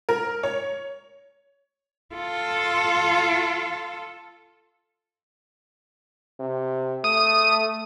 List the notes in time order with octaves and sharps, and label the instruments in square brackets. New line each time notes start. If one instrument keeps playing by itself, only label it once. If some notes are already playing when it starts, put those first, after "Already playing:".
[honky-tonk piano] A#4
C#5
[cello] F4 A4
[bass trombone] C3
[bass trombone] A3 [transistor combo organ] D#6